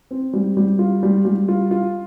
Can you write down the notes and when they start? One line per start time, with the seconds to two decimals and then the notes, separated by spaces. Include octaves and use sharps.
0.11 C4
0.33 G3
0.57 G3
0.79 F4
1.03 G3
1.25 G3
1.48 F4
1.71 F4